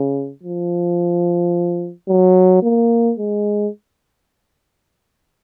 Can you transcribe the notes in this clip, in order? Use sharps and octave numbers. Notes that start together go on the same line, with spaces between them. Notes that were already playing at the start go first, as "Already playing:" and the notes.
Already playing: C#3
F3
F#3
A#3
G#3